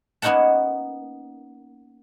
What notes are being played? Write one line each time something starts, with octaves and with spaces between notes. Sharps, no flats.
A#3 B3 C#4 D#4 F#5 A5